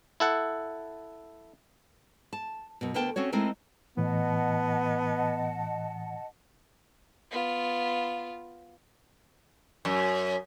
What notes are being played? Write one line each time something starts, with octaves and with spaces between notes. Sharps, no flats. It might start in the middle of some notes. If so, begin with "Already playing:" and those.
E4 A4 F#5
A5
F#2 B2
D2 D3 B3 A#4 G5 A5
C4 C#4 F#4 C#5
G#3 A3 C4 D#4 E4 A#4
A2 E3 B3 D#5 F#5 A5
B3 F4
F#2